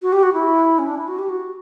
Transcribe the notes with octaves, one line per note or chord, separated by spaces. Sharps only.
F#4
G4
F#4
E4
C#4
D4
E4
F#4
G4
F#4